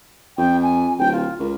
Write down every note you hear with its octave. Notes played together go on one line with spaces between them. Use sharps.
F2 G5
G#5
D1 G5
F4
C#2 A#4